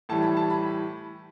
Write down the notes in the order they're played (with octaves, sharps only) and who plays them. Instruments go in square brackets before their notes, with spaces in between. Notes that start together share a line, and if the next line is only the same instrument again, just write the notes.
[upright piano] A2 E3 G3 A5
B5
A5
B5